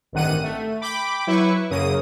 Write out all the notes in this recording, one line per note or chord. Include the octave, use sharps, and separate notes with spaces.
A1 G2 C3 D#3 F#5 D#7
A3
G5 B5 D6
F#3 E4 B4 C#6
F#2 C#3 A#3 D#6 D#7